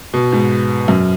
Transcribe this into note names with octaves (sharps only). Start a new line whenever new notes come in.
B2
G#2
F#2